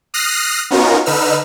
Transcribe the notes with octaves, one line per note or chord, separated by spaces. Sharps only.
D#6 F6 F#6 A#6 C7
B3 C#4 D#4 F4 F#4 A#4
D3 D#4 B4 E6 F6